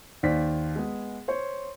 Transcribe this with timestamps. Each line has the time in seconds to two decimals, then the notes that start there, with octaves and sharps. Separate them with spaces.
0.23 D#2 C5 D5 B6
0.76 G#3 B3 G#4
1.28 C5 C#5